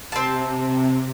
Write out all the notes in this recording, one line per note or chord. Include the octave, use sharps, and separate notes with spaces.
C3 C4 A5